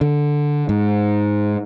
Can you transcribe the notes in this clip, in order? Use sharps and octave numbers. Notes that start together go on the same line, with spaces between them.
D3
G#2